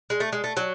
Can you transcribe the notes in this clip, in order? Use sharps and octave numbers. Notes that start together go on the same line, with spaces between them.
G#3
A3
G#3
A3
F#3